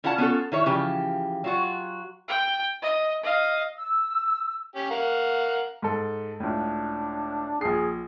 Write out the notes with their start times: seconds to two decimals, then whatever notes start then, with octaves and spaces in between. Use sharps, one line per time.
0.04 C#4 E4 F4 F#5 A5
0.18 B3 C#4 F4 A4
0.52 D#3 E4 C#5
0.66 C#3 E3 F3 G4
1.44 F#3 F4 F#4
2.28 G5
2.82 D#5
3.23 D#5 F5
3.77 E6
4.75 C#4 G4
4.90 A#4 F5 F#5
5.82 G#2 A4
6.40 C#2 A2 D4
7.61 A#1 G#4 C7